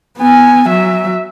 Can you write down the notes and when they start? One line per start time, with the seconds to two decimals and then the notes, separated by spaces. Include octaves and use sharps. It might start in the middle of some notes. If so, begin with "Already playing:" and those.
0.18 B3 G#5
0.69 F#3 E5